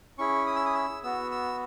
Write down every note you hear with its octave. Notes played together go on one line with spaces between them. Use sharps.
C#4 E4 G#4 C#6
D#6
E6
D#6
E6
B3 F#4 E6
E6